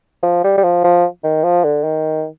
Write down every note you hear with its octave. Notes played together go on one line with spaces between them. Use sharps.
F3
G3
G3
F3
F3
D#3
F3
D3
D#3